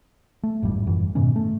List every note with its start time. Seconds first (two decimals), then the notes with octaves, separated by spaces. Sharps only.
0.43 A3
0.62 G#1 F2 A2 G3
0.87 F#2 E3
1.15 G#2 B2 D#3 C#4
1.36 A3